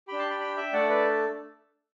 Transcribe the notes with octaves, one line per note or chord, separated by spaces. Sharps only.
D4 G4 G5 B5
A5 C6
G5 B5
G5 B5
E5 G5
A3 D4 A4 D5 F#5
B4 D5